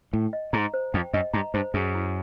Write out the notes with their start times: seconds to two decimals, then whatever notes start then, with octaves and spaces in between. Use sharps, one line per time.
0.13 A2 G5
0.33 D#5
0.53 G#2 A#5
0.74 C5
0.94 F2 G5
1.13 F#2 D#5
1.33 G2 A#5
1.54 G2 C5
1.74 F#2 G#4
1.95 E4